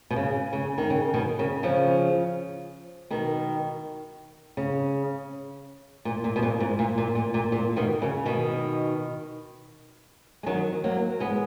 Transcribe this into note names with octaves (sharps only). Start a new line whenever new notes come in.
B2
C#3
C#3
D#3
C#3
B2 D#3
C#3
C#3 F3
B2 D#3
C#3
A#2
A#2
B2
A#2
G#2
A#2
A#2
A#2
A#2
A#2
B2 D#3
C#3
B2 D#3
G#3
D#3 F#3
F#3 A#3
G#3 B3